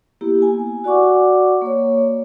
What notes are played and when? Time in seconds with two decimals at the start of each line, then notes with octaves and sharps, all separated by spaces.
0.21 A#3 B3 E4 G4
0.42 G#5
0.84 F#4 D5 F#5 C#6 D6
1.62 A#3 C#5